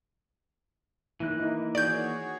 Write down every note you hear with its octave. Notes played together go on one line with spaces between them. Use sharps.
D#3 E3 A#3 E4 F#6
D#4 E4
D#3 F#4 G#4 C#5 D5 G6